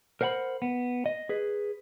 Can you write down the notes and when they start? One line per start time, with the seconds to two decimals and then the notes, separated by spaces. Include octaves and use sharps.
0.21 A#4 C5 F#5 G#5 B5
0.62 B3
1.06 D#5
1.29 G#4 B4